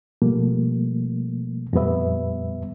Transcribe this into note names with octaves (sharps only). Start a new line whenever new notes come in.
B2 F3 G3 A3 A#3
F2 A#2 G3 B3 B4 E5